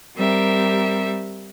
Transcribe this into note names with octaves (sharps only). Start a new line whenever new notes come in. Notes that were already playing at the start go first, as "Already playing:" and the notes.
G3 C4 G4 A#4 E5